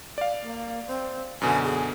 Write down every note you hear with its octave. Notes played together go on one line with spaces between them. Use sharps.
D5 F5
A#3
C4
F#2 B2 D3 G#5
G#4